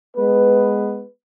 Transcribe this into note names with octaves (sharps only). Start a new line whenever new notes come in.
G#3 B3 B4